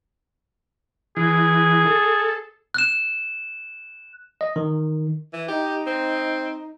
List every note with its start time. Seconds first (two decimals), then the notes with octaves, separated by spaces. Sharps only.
1.17 E3 G#4
1.86 A4
2.74 F#6 E7
4.41 D#5
4.56 D#3
5.33 E3
5.48 D#4 G4
5.87 C4